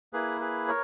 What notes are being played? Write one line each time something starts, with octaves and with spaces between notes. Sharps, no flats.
A#3 E4 G#4 B4
G#4 B4
A#4 C#5